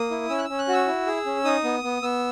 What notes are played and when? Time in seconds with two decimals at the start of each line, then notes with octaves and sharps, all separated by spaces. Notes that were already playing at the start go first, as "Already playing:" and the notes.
Already playing: A#3 D#6
0.11 E4
0.30 C#4 E6
0.38 F#6
0.44 C#4 E6
0.59 F#6
0.68 F#4 E6
0.88 E4
1.07 G#4
1.26 C#4
1.45 D#4 D#6
1.64 B3
1.83 B3
2.02 B3 E6